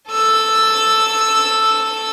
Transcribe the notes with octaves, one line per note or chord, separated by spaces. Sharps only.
A4 E6